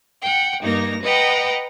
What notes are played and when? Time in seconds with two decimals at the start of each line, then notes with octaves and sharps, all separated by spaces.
0.21 F#5 G5
0.62 G2 A#3 D#4 A#6
1.02 B4 D#5 F#5 G5 A#5